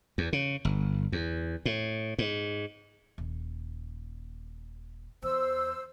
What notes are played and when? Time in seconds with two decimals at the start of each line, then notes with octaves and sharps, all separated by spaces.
0.18 E2
0.33 C#3
0.65 G1
1.12 E2
1.65 A2
2.19 G#2
3.18 D#1
5.22 E2 C5 E6